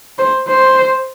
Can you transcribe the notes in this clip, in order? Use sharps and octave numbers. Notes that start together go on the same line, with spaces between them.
C5
C5